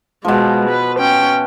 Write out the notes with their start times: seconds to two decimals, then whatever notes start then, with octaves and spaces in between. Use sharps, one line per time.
0.25 B2 F3 G#3
0.70 B4
0.99 C#4 G5